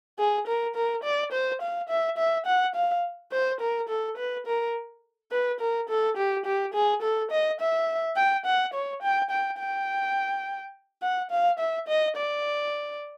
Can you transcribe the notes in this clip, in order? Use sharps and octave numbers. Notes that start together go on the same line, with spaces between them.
G#4
A#4
A#4
D5
C5
F5
E5
E5
F#5
F5
C5
A#4
A4
B4
A#4
B4
A#4
A4
G4
G4
G#4
A4
D#5
E5
G5
F#5
C#5
G5
G5
G5
F#5
F5
E5
D#5
D5